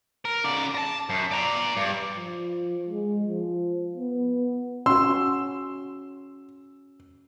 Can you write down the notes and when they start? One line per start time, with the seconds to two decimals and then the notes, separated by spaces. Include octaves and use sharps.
0.25 A#4
0.44 C#3 D5
0.75 A5 A#5
1.09 F#2
1.31 D5 A#5
1.77 G2
2.16 F3
2.89 G#3
3.27 F3
3.97 B3
4.86 C#4 F#4 C6 E6